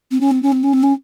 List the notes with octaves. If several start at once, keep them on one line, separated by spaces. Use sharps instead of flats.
C4
C#4
C4
C#4
C4
C#4
C4
C#4